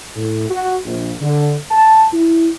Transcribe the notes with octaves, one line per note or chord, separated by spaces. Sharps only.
A2
F#4
A#1
D3
A5
E4